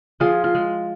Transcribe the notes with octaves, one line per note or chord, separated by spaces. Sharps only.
F3 F4 G#4
F4
G#3